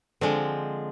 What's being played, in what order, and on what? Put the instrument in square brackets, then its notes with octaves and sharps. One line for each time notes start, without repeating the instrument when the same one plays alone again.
[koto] D3 F3 G#3 C4